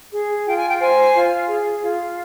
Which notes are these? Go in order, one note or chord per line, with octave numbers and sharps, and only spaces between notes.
G#4
F4 G5
G#5
G5
C5 G#5
F4
G#4
F4